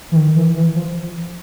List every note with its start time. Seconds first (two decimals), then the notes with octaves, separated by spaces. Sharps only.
0.12 E3
0.16 D#3
0.37 E3
0.56 E3
0.75 F3